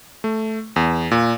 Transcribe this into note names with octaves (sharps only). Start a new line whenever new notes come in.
A3
E2
A#2